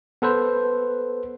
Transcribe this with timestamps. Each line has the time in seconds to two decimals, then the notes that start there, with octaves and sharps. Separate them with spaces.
0.22 B3 A4 B4 C5